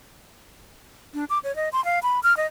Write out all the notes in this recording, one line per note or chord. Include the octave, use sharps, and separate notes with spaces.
D4
D6
C#5
D#5
C6
F5
B5
F6
D#5